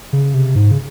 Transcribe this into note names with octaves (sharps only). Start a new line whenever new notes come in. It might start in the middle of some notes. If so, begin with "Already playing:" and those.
C#3
C3
G#2
C#3